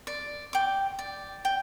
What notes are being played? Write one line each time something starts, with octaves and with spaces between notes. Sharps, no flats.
D5
G5 D6
D5
G5